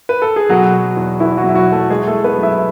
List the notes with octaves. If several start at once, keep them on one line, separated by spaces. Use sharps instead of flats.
B4
A4
G#4
B2 F#3 F#4
F#3
E2
E2 E3 E4
F#3 F#4
B2
E4
F#3 F#4
F#3
A3 A4
E3 G#3 G#4
A3 A4
G#3
B3 B4
F#2
E4 E5